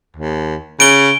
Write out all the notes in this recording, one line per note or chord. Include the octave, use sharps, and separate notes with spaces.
D#2
C#3 D7 G7